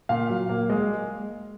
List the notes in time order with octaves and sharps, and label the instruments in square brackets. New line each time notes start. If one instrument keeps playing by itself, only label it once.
[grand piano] A#2 F5
F#3
A#3
G#3